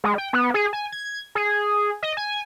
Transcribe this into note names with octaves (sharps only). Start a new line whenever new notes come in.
G#3
G5
B3
G#4
G#5
G#6
G#4
D#5
G#5